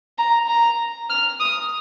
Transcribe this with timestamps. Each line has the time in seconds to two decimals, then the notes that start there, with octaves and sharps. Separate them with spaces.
0.18 A#5
0.48 A#5
1.10 F6
1.40 D#6